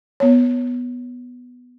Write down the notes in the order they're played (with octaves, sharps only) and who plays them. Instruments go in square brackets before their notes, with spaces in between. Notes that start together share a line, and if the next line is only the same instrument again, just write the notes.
[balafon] B3 C#5